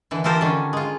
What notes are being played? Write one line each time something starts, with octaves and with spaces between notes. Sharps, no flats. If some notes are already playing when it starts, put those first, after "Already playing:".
D3 E3
E3 F4 G4 A4 A#4 C5
D3 D#3 C#4
G#3 F4